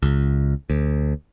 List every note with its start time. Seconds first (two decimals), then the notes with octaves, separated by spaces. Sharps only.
0.03 C#2
0.70 D2